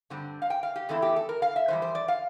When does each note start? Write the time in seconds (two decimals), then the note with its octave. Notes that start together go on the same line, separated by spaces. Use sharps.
0.10 G2 D3 G3 C4
0.42 F5
0.50 G5
0.63 F5
0.76 G4
0.89 E2 E3 A3 C4 E4 A4
1.02 G4
1.16 A4
1.29 A#4
1.42 F5
1.56 E5
1.68 F2 E3 G3 C5
1.82 C5
1.95 D5
2.08 F5